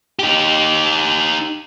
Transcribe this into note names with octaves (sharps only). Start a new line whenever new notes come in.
D#4 G4